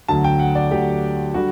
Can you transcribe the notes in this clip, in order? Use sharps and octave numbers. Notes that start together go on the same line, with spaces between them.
D2 D3 F#3 A5
G5
F#5
D5
D2 D3 F#3 G4
D3 G3 F#4